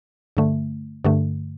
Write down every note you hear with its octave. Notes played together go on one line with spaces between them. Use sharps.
G2 D3 A3
G2 D3 A3